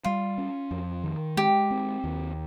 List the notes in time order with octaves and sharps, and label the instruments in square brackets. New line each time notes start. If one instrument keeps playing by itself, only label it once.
[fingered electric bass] G3 [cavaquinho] F4
[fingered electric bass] C#4
F2
D#3
[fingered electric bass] G#3 [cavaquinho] G4
[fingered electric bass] C4
D#2